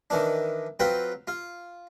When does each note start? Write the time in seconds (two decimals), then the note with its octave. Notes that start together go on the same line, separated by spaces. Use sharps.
0.10 D#3 E3 D4
0.80 F#3 C4 F4 B4 G5
1.27 F4